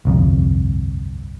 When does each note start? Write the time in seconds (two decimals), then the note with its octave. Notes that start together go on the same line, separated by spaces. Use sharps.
0.05 G1 C2 F2